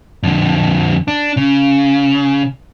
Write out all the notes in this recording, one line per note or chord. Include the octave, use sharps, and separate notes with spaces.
F2 D3
D4
C#3